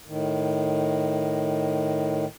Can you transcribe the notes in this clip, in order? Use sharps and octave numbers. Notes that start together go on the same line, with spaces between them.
A2 D#3